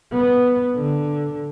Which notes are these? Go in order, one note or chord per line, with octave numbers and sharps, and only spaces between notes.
B3
D3